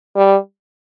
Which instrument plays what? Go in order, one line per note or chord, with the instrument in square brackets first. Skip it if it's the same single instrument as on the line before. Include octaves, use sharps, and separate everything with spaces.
[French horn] G3